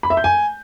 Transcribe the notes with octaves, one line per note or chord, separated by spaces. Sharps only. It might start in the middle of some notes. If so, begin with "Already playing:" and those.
B5
E5
G6
G#5